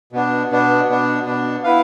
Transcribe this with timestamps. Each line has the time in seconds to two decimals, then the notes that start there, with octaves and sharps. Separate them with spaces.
0.12 B2 B3 D4
0.51 B2 B3 D4
0.89 B2 B3 D4
1.26 B2 B3 D4
1.64 B3 E4 B4 F5